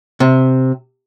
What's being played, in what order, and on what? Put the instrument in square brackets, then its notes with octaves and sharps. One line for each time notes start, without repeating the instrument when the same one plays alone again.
[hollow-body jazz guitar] C3